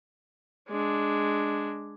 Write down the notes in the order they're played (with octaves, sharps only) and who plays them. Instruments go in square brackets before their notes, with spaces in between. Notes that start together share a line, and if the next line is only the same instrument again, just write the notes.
[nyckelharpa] G#3 D4